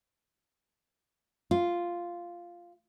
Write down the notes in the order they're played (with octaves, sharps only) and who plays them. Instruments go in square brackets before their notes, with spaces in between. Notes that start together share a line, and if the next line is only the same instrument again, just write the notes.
[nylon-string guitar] F4